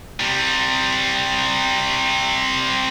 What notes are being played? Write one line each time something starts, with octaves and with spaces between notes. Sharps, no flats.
C3 G3